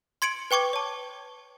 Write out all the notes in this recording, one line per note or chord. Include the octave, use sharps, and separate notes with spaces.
C6 G#6 C#7 D7 F#7
B4 G5 C#6 D6 G#6
C#5 A5